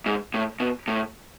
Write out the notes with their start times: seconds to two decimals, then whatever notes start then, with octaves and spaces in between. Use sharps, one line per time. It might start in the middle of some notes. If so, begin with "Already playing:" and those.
0.06 G#2
0.34 A2
0.60 B2
0.88 A2